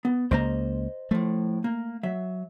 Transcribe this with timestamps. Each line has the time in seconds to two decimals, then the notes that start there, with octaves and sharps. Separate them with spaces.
0.05 B3
0.31 C#2 C#3 A#3 C5 D#5 A#5
1.11 A2 F3 A3
1.64 A#3
2.03 F#3 E5